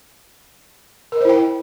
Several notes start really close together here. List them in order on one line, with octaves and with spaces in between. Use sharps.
A#4 D#5 C5 E4 G5